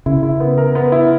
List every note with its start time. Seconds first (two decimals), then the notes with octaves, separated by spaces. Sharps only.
0.06 C#3 E4
0.23 E4
0.40 B3
0.58 A#4
0.75 B3
0.92 E4